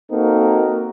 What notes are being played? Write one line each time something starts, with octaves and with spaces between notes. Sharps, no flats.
A#3 C4 D#4 F#4 A4 A#4